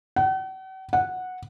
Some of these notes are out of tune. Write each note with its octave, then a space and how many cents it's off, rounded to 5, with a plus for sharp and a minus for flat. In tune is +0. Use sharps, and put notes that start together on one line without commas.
F#5 +45
F#5 -10